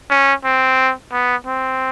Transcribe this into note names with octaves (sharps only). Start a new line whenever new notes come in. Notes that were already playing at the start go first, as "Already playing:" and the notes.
C#4
C4
B3
C4